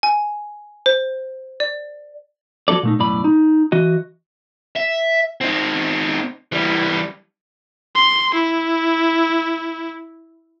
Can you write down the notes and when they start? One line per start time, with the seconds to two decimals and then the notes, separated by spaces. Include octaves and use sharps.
0.03 G#5
0.86 C5
1.60 D5
2.68 F3 F#3 C4 A4 D5
2.83 A#2 A3 D#4
2.99 B1 F#2 A2 D5 B5
3.24 D#4
3.72 E3 F#4 D#5
4.76 E5
5.41 C4 D#4
6.52 E3 G3
7.95 C6
8.34 E4